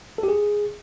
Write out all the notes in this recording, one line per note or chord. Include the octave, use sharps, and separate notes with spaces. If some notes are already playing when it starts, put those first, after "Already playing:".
A4
G4
G#4